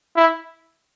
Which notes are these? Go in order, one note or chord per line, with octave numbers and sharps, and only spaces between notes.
E4